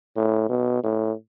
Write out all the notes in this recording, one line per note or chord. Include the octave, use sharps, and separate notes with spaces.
A2
B2
A2